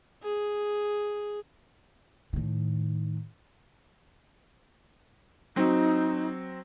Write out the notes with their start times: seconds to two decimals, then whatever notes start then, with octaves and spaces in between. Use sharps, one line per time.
0.23 G#4
2.33 A2 D#3
5.56 F#3 C4 D#4